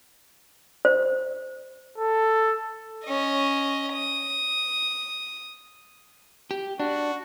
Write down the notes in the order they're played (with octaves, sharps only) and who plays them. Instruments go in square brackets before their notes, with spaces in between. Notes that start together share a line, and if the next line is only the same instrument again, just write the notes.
[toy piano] C5
[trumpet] A4
[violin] C#4 D#5
D#6
[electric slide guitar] G4
[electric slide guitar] D4 [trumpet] F#4